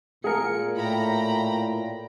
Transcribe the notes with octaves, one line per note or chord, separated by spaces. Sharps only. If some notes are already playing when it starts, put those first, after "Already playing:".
A#2 G#4 A#4 C#7
A2 G5 A#5 B5